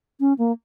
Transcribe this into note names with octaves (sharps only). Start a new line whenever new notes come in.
C#4
A#3